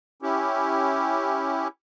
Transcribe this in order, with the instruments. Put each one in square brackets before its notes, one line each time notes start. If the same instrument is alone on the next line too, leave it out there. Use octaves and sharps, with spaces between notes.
[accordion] C#4 E4 G4